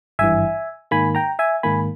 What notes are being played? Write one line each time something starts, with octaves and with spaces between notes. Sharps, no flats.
G#1 G2 E3 E5 G#5
G#2 D#3 A#3 G#5 B5
G5 A#5
E5 G#5
G#2 D#3 A#3 G#5 B5